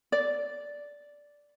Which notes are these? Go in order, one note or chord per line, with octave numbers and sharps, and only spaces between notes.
D5